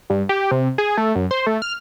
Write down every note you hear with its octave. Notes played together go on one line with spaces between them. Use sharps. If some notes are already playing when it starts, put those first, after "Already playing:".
G2
G4
C3
G#4
A3
F#2
C5
A3
F6